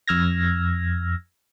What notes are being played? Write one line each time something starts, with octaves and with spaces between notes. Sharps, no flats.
F2 E6 F6 G#6 A#6